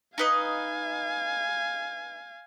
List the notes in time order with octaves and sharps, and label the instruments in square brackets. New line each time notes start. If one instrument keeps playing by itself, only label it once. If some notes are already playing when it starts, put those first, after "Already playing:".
[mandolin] D#4 B4 D#5 [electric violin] F5 G#5